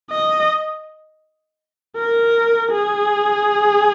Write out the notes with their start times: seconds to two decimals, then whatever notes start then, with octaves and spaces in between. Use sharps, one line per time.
0.11 D#5
1.97 A#4
2.72 G#4